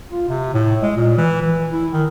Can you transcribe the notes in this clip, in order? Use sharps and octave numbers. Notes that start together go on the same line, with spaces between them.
F4
C3
A2
G#3
A#2
E3
E3
E4
D#3